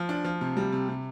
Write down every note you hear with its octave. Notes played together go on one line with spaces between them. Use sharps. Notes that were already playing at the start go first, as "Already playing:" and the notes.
Already playing: F3
D4
F3
C3
G3
C3
C3